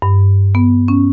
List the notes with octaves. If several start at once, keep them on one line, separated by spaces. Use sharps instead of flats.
G2
B3
C#4